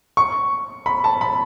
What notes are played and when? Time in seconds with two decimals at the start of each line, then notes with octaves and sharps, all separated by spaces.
0.17 C#6
0.86 B5
1.04 A5
1.21 B5